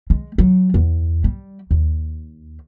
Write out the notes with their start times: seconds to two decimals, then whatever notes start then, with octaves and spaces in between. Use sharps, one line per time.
0.10 G#3
0.38 F#3
0.74 E2
1.24 G3
1.71 D#2